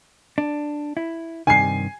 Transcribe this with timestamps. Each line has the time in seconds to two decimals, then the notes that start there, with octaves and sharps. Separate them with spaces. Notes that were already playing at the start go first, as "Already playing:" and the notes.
0.38 D4
0.97 E4
1.47 G2 C3 D#3 G#5 C7